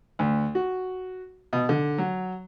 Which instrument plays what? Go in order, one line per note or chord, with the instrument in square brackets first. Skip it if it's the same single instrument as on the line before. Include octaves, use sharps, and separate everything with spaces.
[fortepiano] D2
F#4
B2
D3
F#3